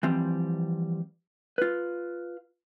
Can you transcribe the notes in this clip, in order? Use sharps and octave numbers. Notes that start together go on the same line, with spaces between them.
E3 F3 G3 C4
F4 B4